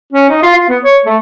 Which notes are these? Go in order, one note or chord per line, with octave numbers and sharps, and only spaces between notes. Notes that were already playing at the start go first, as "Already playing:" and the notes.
C#4
D#4
F4
F4
B3
C#5
A3